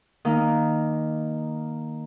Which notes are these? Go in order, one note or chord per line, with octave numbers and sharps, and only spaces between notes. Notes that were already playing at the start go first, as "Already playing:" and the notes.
D#3 A#3 D#4